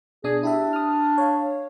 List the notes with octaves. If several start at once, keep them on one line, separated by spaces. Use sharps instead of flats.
B2 D4 G#4 D#6
D4 E4 G4 E5
D#6 F6
C#5 F5